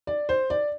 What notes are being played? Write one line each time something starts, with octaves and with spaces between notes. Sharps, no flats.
D5
C5
D5